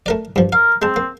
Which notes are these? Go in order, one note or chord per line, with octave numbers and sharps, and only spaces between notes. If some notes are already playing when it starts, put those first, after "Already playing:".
A3 A#4 D5
G2 F3
A#4 F5
G#3 C4 A5
A#3